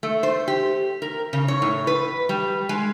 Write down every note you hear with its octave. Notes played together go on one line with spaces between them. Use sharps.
A3
C5
G4
A#4
C#3
C#5
A2
B4
G3
G#3